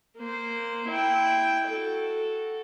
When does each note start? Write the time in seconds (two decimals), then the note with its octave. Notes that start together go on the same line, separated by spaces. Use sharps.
0.18 A#3 C5
0.88 E4 G5
1.68 F#4 A4